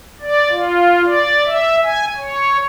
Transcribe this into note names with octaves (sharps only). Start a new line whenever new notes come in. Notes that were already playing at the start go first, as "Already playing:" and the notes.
D5
F4
D5
E5
G#5
C#5